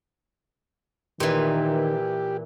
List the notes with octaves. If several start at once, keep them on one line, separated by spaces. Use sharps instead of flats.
A#2 D#3 E3 G4